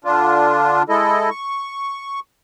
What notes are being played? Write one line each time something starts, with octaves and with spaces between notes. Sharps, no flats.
D3 D4 F4
G#3 E4 A4 D#5
C#6